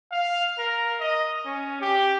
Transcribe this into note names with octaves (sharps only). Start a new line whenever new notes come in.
F5
A#4
D#5
C#4
G4